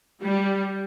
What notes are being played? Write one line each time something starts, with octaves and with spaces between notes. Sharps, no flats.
G3